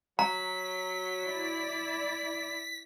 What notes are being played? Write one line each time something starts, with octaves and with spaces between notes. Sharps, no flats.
F#3 A#5 B6
E4 D5